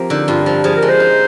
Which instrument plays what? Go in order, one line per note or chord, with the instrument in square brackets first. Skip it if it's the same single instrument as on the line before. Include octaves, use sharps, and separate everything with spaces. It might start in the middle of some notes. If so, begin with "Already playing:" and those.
Already playing: [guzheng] F3 A#3 C4 G4
[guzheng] D3 [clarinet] D#4
[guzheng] G2 [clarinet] F4
[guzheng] F3
[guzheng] F3 [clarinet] G#4
[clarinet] A#4
[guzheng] G#3
[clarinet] C5
[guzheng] D#4